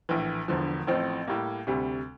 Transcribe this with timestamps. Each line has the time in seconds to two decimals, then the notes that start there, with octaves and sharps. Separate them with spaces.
0.09 A#1 A2 E3
0.48 E1 E2 D3 F3
0.87 A1 A2 F3 C4
1.27 A2 G3 A#3
1.67 D2 C3 G3